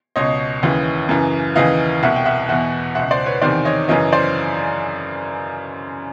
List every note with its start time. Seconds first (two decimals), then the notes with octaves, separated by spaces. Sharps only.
0.16 C#2 B2 C#5 D#5
0.63 D#2 C#3 E3
1.09 F#2 C#3 E3
1.55 D#2 C#3 E3 D#5 F5
2.02 C2 B2 E5 F#5
2.16 G5
2.25 E5 F#5
2.49 E2 B2 E5 F#5
2.95 C#2 B2 E5 F#5
3.11 C5 D5
3.26 B4 C#5
3.42 E2 C3 D#3 C5 D5
3.65 C#5 D#5
3.88 F#2 C#3 E3 C#5 D#5
4.12 C5 D5